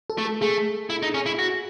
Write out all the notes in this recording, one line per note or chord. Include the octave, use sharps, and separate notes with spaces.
A4
A3
A4
A3 G#4
E4
D#4
C#4
E4
F#4